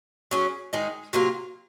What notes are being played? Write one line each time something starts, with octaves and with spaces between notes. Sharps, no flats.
F#3 C#4 G#4
D#3 G#3 D#4 G#4
C3 F#3 A#3 F4